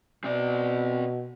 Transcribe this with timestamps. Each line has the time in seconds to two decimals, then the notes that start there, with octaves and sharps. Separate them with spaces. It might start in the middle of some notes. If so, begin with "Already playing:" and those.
0.24 B2 C4 D5